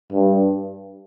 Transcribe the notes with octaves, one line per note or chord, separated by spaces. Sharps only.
G2